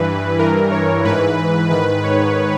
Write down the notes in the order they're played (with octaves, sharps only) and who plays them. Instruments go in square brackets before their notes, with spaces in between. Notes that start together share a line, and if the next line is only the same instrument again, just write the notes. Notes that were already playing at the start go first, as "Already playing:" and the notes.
Already playing: [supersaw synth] G2 E3 B4
G2 E3 A#4
C#5
G#2 E3 B4
G#2 D#3 B4
C#5